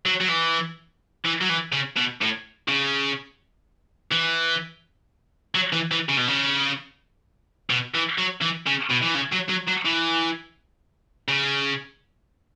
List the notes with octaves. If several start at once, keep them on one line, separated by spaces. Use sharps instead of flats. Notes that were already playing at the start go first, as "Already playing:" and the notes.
F#3
F#3
E3
E3
F#3
E3
C#3
B2
A2
C#3
E3
F#3
E3
E3
C#3
B2
C#3
B2
E3
F#3
E3
C#3
B2
E3
C#3
F#3
F#3
F#3
E3
C#3